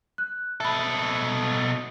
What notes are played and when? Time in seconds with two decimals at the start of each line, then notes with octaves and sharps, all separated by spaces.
0.18 F#6
0.60 B2 A4 E5 B5